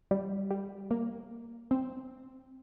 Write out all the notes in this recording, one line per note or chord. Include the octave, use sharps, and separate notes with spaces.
G3
G3
A#3
C4